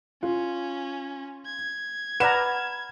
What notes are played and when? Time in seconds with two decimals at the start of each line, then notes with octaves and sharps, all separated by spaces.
0.23 C#4 F4
1.46 G#6
2.20 B4 D5 F#5 A#5 B5 F6 E7